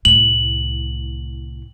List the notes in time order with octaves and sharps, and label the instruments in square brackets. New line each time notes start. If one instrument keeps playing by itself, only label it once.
[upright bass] C2 A2 [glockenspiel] F#7